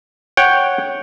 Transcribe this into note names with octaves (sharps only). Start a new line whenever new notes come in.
C#5 F#5 G5